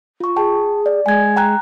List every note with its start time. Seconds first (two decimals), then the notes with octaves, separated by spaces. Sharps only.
0.20 F4 C#6
0.36 G#4 G5 A5
0.86 D5
1.06 G#3 G#5 G#6
1.36 G5 A#5 F#6